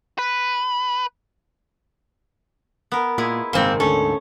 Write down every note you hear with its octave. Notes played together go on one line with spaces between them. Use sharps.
B4
B3 A#4
A#2 G#3 E4 G#4
F#1 G#2 C3 D#3 G#3 A#3 C4
D2 G#2 D3 C#4 A4